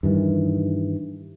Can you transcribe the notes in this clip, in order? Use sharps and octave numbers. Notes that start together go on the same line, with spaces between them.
G2 D#3 E3